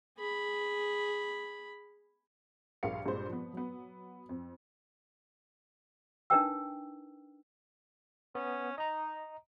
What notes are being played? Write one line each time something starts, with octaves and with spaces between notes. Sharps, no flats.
G#4 B5
A#1 G2 G#4 A#4 F5 C#7
G2 A#2 G#3 C5
F3 B3
F#3 B3
F2
D4 D#4 A#4 B4 G5 E6
B3 C#4
D#4 D#5 A#5